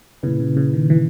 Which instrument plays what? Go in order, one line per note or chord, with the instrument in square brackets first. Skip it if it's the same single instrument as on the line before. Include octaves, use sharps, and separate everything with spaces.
[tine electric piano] A#2 A#3 C#4 E4 B4 [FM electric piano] C#3
[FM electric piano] C#3
C#3
D#3
E3